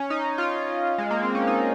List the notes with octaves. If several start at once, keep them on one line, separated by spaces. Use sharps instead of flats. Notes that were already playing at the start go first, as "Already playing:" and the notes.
Already playing: C#4
D#4
F4
G#3
A#3
C4
C#4
D#4